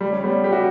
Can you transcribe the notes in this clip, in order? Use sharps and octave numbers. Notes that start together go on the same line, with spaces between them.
G3
C#4
G3 B3
G4
F#4